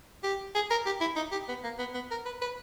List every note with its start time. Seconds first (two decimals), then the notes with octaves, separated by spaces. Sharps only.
0.24 G4
0.55 G#4
0.71 A#4
0.86 G4
1.01 E4
1.16 D#4
1.32 G4
1.49 B3
1.64 A#3
1.79 B3
1.95 B3
2.11 A#4
2.26 B4
2.42 B4